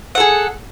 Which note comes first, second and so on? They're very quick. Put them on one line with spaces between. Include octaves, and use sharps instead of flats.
F#5 A4 G#4